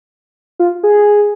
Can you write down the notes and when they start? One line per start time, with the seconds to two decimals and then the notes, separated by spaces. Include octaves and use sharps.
0.59 F4
0.83 G#4